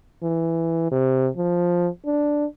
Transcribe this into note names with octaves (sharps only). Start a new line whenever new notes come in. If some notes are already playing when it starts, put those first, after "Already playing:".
E3
C3
F3
D4